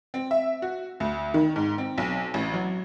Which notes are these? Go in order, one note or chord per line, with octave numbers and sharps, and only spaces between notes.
C4
E5
F#4
D2
D#3
G#2
C4
B1
A1
F#3